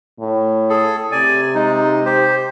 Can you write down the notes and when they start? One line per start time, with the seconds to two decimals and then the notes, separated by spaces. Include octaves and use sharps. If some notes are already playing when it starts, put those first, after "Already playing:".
0.20 A2
0.69 G#4 A4
1.12 C3 D5 G#5
1.55 G#3 D#4
2.05 G4 C5